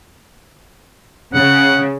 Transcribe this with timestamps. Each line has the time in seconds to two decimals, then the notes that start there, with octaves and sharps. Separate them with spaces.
1.34 C#3 F#5